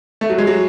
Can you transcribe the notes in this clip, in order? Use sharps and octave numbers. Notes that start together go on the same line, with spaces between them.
A3
F#3
G#3
F#3